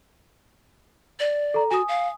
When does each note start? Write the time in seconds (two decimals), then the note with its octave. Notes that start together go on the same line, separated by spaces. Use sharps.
1.20 D5
1.54 A4 A#5
1.71 F#4 G#5 D#6
1.88 F5